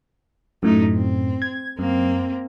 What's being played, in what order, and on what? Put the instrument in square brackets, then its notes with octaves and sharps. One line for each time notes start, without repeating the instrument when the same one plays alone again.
[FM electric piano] F#2 A2 [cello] A3 D#4
[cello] C4
[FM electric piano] G#6
[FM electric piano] F#2 [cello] A#3 C4